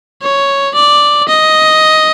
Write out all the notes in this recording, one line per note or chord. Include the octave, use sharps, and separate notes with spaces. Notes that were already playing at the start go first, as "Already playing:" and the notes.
C#5
D5
D#5